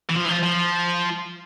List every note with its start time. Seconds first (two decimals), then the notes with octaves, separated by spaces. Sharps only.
0.09 E3
0.16 F3
0.25 E3
0.29 F3
0.43 F3